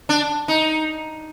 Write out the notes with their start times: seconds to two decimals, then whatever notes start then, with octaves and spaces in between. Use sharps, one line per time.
0.09 D4
0.48 D#4